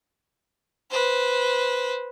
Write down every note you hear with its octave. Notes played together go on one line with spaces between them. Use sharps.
B4 C5